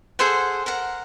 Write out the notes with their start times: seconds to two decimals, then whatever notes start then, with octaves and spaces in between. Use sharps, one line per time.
0.19 G#4 A4 C5 F#5
0.66 A#4 F#5